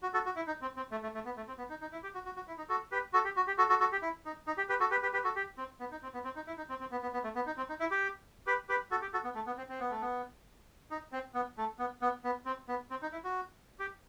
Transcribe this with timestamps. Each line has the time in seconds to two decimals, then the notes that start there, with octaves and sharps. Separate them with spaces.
0.02 F#4
0.14 F#4 A4
0.25 F#4
0.36 E4
0.47 D#4
0.62 C4
0.76 C4
0.91 A3
1.03 A3
1.14 A3
1.25 B3
1.37 A3
1.48 C4
1.58 B3
1.70 D#4
1.81 D#4
1.92 E4
2.03 G4
2.14 F#4
2.25 F#4
2.36 F#4
2.47 E4
2.58 D#4
2.69 F#4 A4
2.92 G4 B4
3.13 F#4 A4
3.25 G4
3.36 F#4
3.47 G4
3.58 F#4 A4
3.69 F#4 A4
3.80 F#4 A4
3.92 G4
4.02 E4
4.25 D#4
4.47 D#4
4.57 G4
4.69 G4 B4
4.80 F#4 A4
4.91 G4 B4
5.02 G4 B4
5.13 G4 B4
5.24 F#4 A4
5.36 G4
5.57 C4
5.80 B3
5.91 D#4
6.03 C4
6.14 B3
6.24 C4
6.36 D#4
6.47 E4
6.57 D#4
6.69 C4
6.80 C4
6.91 B3
7.02 B3
7.13 B3
7.24 A3
7.36 B3
7.46 D#4
7.57 C4
7.69 D#4
7.80 E4
7.91 G4
8.47 G4 B4
8.69 G4 B4
8.91 F#4 A4
9.02 G4
9.13 F#4 A4
9.24 B3
9.35 A3
9.47 B3
9.57 C4
9.69 C4
9.80 B3
9.91 A3
10.02 B3
10.90 D#4
11.12 C4
11.34 B3
11.58 A3
11.79 B3
12.02 B3
12.24 B3
12.45 C4
12.68 B3
12.90 C4
13.02 D#4
13.12 E4
13.24 F#4
13.79 G4